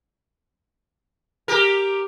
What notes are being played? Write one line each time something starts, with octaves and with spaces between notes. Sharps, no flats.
G4 A#4